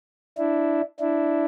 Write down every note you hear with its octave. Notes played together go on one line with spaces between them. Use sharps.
D4 E4
D4 E4